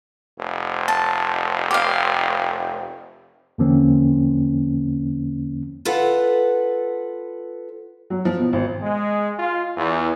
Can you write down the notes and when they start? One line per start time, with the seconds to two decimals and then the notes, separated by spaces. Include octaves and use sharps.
0.39 F1
0.88 A5
1.71 G4 F5
3.58 E2 D3 F3 A#3 C4 C#4
5.85 F4 A4 B4 F#5
8.10 F#3
8.25 F3
8.38 B2
8.53 G#1
8.82 G#3
9.39 F4
9.77 E2